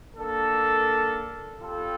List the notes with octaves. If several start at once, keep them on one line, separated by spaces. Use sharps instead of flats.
A#3 D4 A4
G3 C4 F4 A4